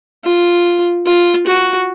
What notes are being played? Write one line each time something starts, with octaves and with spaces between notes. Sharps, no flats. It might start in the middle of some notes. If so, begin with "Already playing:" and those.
F4
F4
F#4